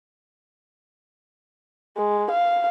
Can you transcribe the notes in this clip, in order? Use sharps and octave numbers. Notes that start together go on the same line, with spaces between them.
G#3
F5